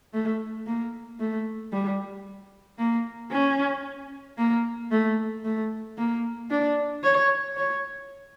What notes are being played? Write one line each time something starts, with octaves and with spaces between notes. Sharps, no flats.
A3
A#3
A3
G3
A#3
C#4
A#3
A3
A3
A#3
D4
C#5
C#5